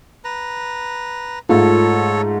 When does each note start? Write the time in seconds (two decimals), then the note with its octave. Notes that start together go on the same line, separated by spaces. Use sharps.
0.24 B4 A#5
1.49 G#2 A3 F4 A4 C#5